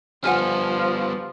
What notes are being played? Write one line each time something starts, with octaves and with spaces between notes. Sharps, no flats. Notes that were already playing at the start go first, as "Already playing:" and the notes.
F3 G3 B3 F#5 G#5 F6